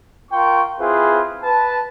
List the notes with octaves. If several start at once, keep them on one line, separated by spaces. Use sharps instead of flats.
F4 A#4 G5 C#6
C4 E4 F4 G#4 B4 C5
B4 A5